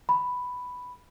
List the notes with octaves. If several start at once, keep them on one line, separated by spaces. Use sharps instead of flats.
B5